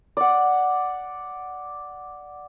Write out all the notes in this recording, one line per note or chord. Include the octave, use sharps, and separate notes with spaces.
D5 F#5